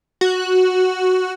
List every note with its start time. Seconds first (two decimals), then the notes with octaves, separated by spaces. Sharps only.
0.21 F#4